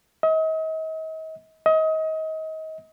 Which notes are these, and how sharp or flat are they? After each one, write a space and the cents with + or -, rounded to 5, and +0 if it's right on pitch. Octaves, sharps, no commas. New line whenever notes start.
D#5 +40
D#5 +30